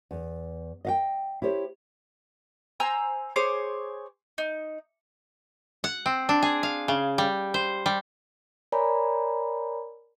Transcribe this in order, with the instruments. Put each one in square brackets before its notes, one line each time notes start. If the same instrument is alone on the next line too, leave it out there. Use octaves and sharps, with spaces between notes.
[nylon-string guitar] E2
D#5 F5 G5
E4 G4 C5 C#5
[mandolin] C5 G#5 A#5 E6
G#4 C5 C#5 D6
D#4
[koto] F#5
C4
D4
G#4
F5
C#3
G3
C5
G3
[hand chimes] A#4 C#5 D5 G#5 A#5 B5